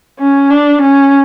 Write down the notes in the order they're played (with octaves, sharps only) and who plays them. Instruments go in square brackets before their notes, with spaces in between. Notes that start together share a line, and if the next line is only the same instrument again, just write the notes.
[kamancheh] C#4
D4
C#4